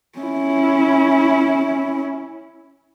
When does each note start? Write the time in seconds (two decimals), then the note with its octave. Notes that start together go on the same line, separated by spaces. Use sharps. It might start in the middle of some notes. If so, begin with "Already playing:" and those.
0.18 C#4 E4